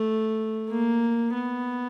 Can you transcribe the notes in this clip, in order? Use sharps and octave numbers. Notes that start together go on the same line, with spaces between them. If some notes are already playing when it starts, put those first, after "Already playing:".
Already playing: A3
A#3
B3